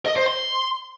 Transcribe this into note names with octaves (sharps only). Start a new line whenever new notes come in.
D#5
C5
C6